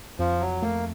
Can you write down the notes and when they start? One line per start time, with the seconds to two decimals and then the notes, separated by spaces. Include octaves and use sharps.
0.19 F2 F3
0.41 F#3
0.62 A3 A#3